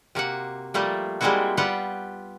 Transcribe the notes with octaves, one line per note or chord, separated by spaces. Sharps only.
C3 A#3 F#4 F#5
F3 G3 A3 A#3
G3 G#3 A#3 C4 E4 F#4
G3 B3 F4 G4 F#5